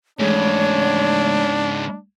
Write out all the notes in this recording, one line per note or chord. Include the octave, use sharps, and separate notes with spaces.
G#2 C#3 E3 G#3 A3 D4 C#5